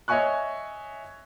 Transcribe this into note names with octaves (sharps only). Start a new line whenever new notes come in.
C#5 D#5 E5 G#5 C#6 F#6